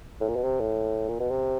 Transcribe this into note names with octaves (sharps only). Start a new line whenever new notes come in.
A2
A#2
B2
C3
A2
A#2
B2
C3